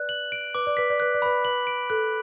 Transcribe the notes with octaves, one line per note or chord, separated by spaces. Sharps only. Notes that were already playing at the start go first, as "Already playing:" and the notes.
Already playing: B4 D5 F#6
F#7
D7
B4 D6
D5
B4 B6
D5
B4 F#6
D5
B4 B5
B4 F#7
D7
A4 F#6